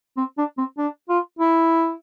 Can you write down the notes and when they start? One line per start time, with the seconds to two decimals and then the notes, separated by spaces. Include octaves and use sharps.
0.17 C4
0.38 D4
0.58 C4
0.78 D4
1.09 F4
1.39 E4